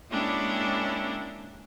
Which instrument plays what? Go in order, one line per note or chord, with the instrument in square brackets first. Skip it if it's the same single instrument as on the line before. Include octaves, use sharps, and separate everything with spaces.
[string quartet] G#3 A#3 C#4 D4 E4 G4